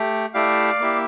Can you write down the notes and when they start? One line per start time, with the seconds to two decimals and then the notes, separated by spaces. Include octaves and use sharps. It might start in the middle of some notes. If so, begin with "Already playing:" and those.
Already playing: A3 G4
0.34 A3 E4 G4 D5 F5
0.80 A#3 E4 G4